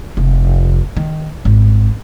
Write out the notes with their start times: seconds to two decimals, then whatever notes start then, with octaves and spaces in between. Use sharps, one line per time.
0.17 F1
0.97 D#3
1.45 G#1